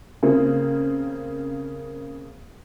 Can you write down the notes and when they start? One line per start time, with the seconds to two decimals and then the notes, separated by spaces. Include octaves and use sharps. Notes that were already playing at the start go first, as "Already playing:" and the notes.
0.23 C#3 A#3 C4